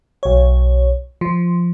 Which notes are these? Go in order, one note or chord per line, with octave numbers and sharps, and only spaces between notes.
B1 C#5
F3